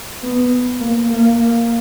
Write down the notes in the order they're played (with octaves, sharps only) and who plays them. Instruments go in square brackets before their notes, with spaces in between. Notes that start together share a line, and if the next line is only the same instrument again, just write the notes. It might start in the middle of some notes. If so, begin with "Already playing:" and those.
[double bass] B3
A#3
A#3